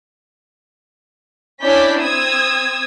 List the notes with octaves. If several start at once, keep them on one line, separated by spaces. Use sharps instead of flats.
C#4 D4 E4 D5 G6 B6
C4 D#6 E6 G#6